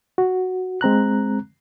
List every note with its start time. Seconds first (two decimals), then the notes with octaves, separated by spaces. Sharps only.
0.18 F#4
0.81 G#3 C4 A#5 F#6